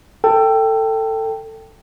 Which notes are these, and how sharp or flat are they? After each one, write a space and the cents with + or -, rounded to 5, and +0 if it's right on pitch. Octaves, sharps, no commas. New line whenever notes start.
A4 +20 G5 +0